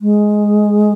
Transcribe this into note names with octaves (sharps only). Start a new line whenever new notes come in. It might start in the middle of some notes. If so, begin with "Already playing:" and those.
G#3